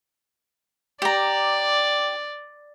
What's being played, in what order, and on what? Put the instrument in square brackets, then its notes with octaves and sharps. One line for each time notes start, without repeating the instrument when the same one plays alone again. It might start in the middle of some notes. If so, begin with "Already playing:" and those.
[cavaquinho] G4 A#5 [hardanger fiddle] D5